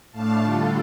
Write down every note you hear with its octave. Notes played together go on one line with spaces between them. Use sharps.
A2 A3 D4 F5 A5
D3 G3 D4 F4 A4